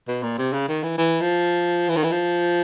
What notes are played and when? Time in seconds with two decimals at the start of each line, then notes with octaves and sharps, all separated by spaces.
0.08 B2
0.23 A#2
0.38 C3
0.53 C#3
0.68 D#3
0.83 E3
0.98 E3
1.21 F3
1.89 E3
1.97 D#3
2.04 E3
2.12 F3